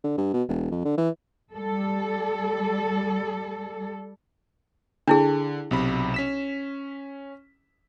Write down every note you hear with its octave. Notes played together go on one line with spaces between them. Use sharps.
D3
G2
B2
E1
F2
D3
E3
G3 A4
D3 D4 E4 G#4
B1 C3 B5
C#4 B6 E7